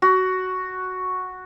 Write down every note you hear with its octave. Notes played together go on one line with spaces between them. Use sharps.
F#4